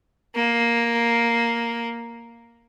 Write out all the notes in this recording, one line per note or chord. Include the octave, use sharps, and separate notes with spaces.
A#3